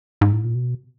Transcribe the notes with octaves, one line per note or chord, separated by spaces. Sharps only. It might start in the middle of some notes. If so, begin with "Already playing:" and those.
G#2
A2
A#2
B2